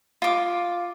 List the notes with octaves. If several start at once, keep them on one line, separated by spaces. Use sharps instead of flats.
F4 D6